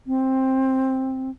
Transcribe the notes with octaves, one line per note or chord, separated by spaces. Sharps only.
C4